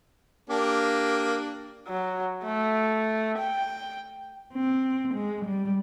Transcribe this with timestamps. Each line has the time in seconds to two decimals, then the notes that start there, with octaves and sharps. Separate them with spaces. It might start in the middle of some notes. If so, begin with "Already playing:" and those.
0.50 A#3 D4 G4
1.87 F#3
2.44 A3
3.37 G5
4.54 C4
5.14 G#3
5.44 G3